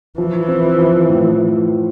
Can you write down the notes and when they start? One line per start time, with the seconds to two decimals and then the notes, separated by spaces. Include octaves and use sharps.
0.18 E3 F3
0.48 C4
0.78 F3
1.09 A2